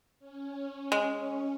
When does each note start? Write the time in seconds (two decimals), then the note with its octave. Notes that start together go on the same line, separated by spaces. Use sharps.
0.19 C#4
0.92 G#3